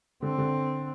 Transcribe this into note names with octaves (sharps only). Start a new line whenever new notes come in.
D3 C4
D3